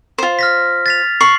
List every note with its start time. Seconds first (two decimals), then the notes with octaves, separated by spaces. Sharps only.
0.18 F4 C5
0.39 F6 A#6 B6
0.86 A6 B6 F7
1.21 C#6 C7 F#7